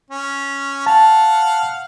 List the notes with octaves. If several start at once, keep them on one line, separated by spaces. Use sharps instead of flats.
C#4
F5 F#5 A5